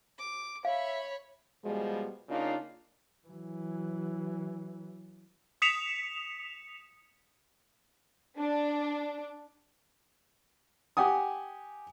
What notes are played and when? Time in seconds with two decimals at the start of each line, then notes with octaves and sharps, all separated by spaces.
0.19 D6
0.65 C#5 E5 F5 B5
1.64 B2 F3 G3 G#3
2.29 C#3 A#3 D4 D#4 F4
3.27 E3 F#3
5.62 D#6 B6 C#7 E7 F7
8.38 D4
10.97 G4 F#5 G#5 D#6